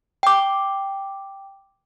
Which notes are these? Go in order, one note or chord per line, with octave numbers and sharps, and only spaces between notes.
G5 D6